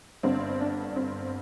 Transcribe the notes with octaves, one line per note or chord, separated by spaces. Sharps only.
G1 G2 D3 C4
D4
C4